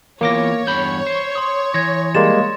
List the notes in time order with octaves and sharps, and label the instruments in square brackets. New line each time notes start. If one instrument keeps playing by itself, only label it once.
[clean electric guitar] E3 B3 F4 [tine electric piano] A#3 D6 A#6 [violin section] C#5
[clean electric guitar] E2 G2 B5 [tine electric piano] G6
[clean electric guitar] C5
[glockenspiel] C6 D#6
[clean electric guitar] E3 [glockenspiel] G#6 A#6
[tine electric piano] G3 G#3 A#3 [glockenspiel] C6 A6 E7